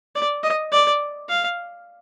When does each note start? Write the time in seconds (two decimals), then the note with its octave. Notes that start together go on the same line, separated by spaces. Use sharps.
0.15 D5
0.43 D#5
0.72 D5
1.29 F5